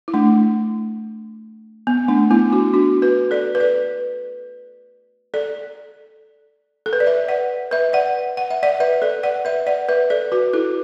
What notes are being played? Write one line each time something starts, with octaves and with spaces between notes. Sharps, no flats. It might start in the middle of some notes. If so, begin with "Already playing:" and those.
E4
A3 D4
B3
A3 D4
B3 E4
D4 F#4
D4 F#4
F#4 B4
A4 D5
B4
A4 D5
A4 D5
A4
B4
D5
B4 E5
D5 F#5
B4 E5
D5 F#5
F#5
E5
D5 F#5
B4 E5
A4 D5
D5 F#5
B4 E5
D5 F#5
B4 E5
A4 D5
F#4 B4
E4 A4